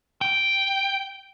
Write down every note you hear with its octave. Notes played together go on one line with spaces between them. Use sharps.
G5